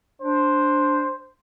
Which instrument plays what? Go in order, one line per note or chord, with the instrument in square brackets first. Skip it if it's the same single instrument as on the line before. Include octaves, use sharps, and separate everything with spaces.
[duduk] D4 [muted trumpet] C5